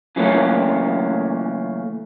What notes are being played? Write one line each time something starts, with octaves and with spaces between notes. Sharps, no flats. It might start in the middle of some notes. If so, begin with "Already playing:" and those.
C#3 E3 F#3 A3 A#3 C#4